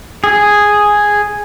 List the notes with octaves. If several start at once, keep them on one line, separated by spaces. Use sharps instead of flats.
G#4